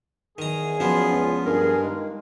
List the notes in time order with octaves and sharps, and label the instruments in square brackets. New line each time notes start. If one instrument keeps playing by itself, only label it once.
[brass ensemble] E2 G#4 [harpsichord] D#3 A#5
[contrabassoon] F#2 [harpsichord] F3 B3 [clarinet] F4
[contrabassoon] C#2
[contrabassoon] G2 [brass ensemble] G#4 [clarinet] A#4
[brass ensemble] D#3 A#3 [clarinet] G#3